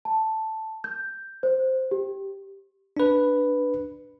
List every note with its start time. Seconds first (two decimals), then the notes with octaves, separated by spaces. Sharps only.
0.05 A5
0.84 G6
1.43 C5
1.91 G4
2.97 D4 B4